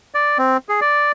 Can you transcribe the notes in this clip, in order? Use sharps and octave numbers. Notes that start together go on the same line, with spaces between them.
D5
C4
G#4
D5